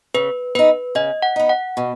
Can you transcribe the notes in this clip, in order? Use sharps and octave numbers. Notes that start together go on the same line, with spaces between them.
C#3 B4
B3 D#4 B4
C#3 D#5
F#5
B3 D#4
F#5
B2